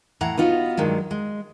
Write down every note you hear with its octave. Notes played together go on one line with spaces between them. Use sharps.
A2 E3 F#5 A#5
B3 D#4 F4 F#4
G2 D#3 F#3 G#3
G#3